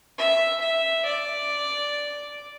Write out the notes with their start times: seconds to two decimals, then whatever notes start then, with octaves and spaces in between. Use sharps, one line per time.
0.18 E5
0.62 E5
1.06 D5